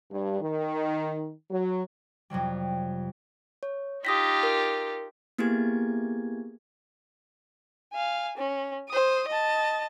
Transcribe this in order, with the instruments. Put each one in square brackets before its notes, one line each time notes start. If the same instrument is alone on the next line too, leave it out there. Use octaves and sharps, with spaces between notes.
[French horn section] G2
D#3
F#3
[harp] F2 C3 F#3 G3
[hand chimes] C#5
[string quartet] D#4 F4 G4 [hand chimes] D#6 A#6 B6
[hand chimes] A#4
A#3 B3 E4 G4 G#4 G#6
[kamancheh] F5 G#5
C#4
C5 D#6
D#5 A5